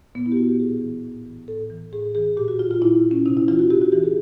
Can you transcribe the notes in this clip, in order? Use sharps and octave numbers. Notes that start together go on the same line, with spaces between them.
A#2 B3
E4
G4
F#4
G4
A2 G#4
E3
A2
E3
A2 A4
E3
A2 G#4
E3 G#4
A#2 G4
F#4
F4
F4
A#2 E4
C#4
C3 D#4
E4
E3 F4
F#4
C3 G4
F#4
E3 G4
G#4